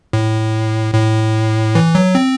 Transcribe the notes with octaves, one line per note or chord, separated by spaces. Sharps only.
A2
A2
E3
F#3
C4